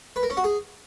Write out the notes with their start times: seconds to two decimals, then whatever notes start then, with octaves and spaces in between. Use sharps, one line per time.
0.16 B4
0.23 A#4
0.30 C#4
0.37 F#4
0.44 G#4